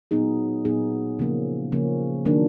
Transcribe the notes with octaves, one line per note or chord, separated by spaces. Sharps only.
A#2 F#3 B3 D#4 G#4
A#2 F#3 B3 D#4 G#4
C#3 F3 A#3 C#4
C#3 F3 A#3 C#4
D#3 F#3 A#3 D4